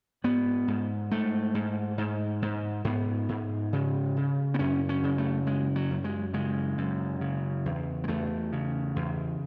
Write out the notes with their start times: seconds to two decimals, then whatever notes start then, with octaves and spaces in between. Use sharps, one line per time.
0.24 G#2 B3
0.68 G#2
1.11 G#2 A3
1.55 G#2
1.98 G#2
2.42 G#2
2.84 G#2 B3
3.29 G#2
3.73 C#3
4.17 C#3
4.54 B3
4.59 F#2 C#4
4.89 C#4
5.03 C#3
5.18 A3
5.46 F#2 G#3
5.76 F#3
5.91 F#2
6.04 G#3
6.33 C#3 G#3
6.78 F#2
7.21 C#3
7.65 E2
8.04 G#3
8.08 E2 A3
8.52 C#3
8.96 E2